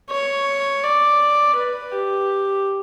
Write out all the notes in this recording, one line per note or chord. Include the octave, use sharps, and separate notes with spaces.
C#5
D5
B4
G4